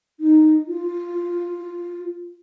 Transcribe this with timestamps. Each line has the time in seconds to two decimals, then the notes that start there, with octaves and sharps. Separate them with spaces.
0.20 D#4
0.68 F4